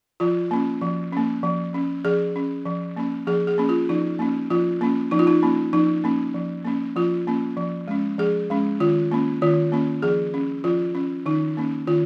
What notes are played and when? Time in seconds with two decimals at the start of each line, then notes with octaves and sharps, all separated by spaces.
0.20 F3 F4
0.51 A#3 C#4
0.81 F3
1.12 A#3 C#4
1.43 F3
1.74 C#4
2.05 F3 G#4
2.36 C#4
2.66 F3
2.97 A#3 C#4
3.27 F3 G#4
3.47 G#4
3.58 A#3 C#4
3.69 F4
3.89 F3 D#4
4.19 A#3 C#4
4.50 F3 F4
4.81 A#3 C#4
5.11 F3 D#4
5.19 F4
5.27 D#4
5.43 A#3 C#4
5.73 F3 D#4
6.04 A#3 C#4
6.35 F3
6.65 A#3 C#4
6.96 F3 F4
7.27 A#3 C#4
7.57 F3
7.88 G#3 C#4
8.18 F3 G#4
8.50 G#3 C#4
8.80 D#3 F4
9.12 A#3 C#4
9.42 D#3 F4
9.72 A#3 C#4
10.02 F3 G#4
10.34 C#4
10.64 F3 F4
10.95 C#4
11.26 D#3 D#4
11.57 A#3 C#4
11.87 D#3 F4